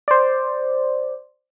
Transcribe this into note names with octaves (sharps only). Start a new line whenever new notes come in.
C5 D5